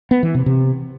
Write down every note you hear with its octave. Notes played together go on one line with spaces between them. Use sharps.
B3
E3
C3
C3